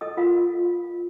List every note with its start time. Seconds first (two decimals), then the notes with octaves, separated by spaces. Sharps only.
0.01 A4 D#5 D#6
0.17 F4 A#4 F5